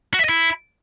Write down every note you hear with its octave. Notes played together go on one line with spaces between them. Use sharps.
F#4
E5
D#5
E4